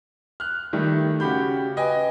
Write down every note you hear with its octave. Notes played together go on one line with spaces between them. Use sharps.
F6 F#6
D#3 G3 A3
C#3 F#4 G4 B5 G6
B4 D#5 G5 G#5